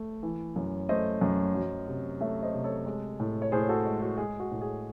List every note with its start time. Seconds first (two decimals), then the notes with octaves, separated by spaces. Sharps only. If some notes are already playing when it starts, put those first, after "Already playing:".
Already playing: A3
0.23 E3
0.56 F#2
0.89 A3 C5 D#5
1.21 F#2
1.55 F#3
1.88 C3
2.21 A3 C#5 E5
2.43 C5 D#5
2.54 C3
2.64 A4 C#5
2.86 G#3
3.20 A2
3.42 C#5
3.52 A2 G#4 C5
3.69 F#4 A4
3.86 G#3
4.02 F#4 A4
4.18 G#3 G#4
4.40 F#4
4.51 A2
4.61 G#4